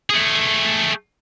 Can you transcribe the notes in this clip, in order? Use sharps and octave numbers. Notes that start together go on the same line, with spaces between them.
A3 G#4